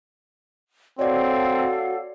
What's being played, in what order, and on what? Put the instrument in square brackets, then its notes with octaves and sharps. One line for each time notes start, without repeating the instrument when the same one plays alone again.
[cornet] C4 [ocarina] F#4 [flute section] A4 F5 F#5 [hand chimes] C#5 D5